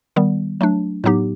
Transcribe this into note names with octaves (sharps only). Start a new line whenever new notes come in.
D#3 G3 B3
F#3 A3 D4
A2 F#3 B3 D#4 G4